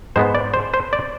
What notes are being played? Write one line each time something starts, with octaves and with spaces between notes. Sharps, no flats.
G#2 G#3 B3 C5
D5
C5
C5
D5